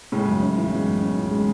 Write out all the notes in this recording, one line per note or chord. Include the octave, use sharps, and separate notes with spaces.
A2 C#3 G#3
F#2
C#4
E3
B2 G#3
F#2
C#4
E3
G#3